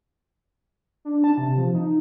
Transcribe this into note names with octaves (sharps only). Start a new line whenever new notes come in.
D4
A5
C3
F3
D#4